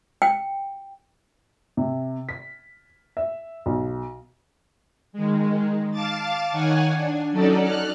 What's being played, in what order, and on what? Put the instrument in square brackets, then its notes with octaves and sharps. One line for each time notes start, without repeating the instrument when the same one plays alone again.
[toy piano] G5
[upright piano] C3
B6
E5
B1
[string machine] D#3 G#3
F5 A5 D6 A6
D#3 C#5 F#5 G#5
D4
F#3 C#4 D#4 A4 D5
F6 F#6